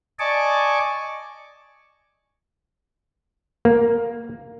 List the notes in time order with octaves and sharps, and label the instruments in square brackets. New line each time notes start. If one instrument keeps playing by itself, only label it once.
[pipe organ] D5 D#5 G#5 A5 C#6 D6
[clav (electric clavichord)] A#3